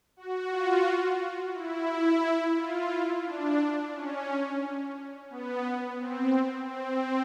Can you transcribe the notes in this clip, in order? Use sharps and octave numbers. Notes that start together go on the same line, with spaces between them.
F#4
F4
E4
E4
F4
E4
D4
C#4
B3
C4
C4